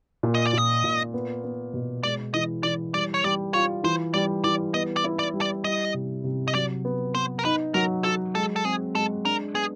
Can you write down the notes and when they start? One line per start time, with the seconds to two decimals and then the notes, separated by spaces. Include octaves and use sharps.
0.23 A#2
0.34 D#5
0.47 D5
0.53 A#2 D#5
0.84 A#2
1.14 B3
1.44 B3
1.74 B2
2.03 G#3 D5
2.34 E3 D#5
2.63 E3 D5
2.94 G3 D5
3.14 C#5
3.24 G3 D5
3.54 F4 C#5
3.84 E3 C5
4.14 G3 D5
4.44 E3 D5
4.74 B3 D#5
4.97 D5
5.04 E4
5.19 D5
5.34 G3
5.41 D5
5.64 G3 D#5
5.94 C3
6.24 C3
6.48 D#5
6.55 F#3 D5
6.85 B3
7.15 B3 C5
7.39 A#4
7.45 D#4 B4
7.74 F#3 A#4
8.04 F#4 A4
8.35 G#3 A4
8.56 A4
8.65 C4 G#4
8.95 G#3 A4
9.25 D4 A#4
9.55 B3 G#4